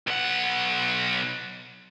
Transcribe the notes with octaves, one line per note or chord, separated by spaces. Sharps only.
B1 F#5